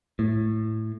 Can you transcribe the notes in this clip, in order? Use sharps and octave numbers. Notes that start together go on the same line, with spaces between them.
A2